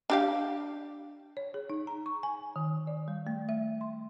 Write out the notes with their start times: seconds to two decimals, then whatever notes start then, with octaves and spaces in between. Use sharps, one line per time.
0.10 D4 G4 F5
1.37 C#5
1.54 G#4
1.70 D#4
1.87 A#5
2.06 C#6
2.23 G#5
2.56 D#3
2.87 D5
3.08 G3
3.27 A3
3.49 E5
3.81 C6